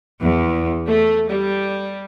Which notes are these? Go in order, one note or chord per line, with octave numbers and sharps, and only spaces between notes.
E2
A3
G3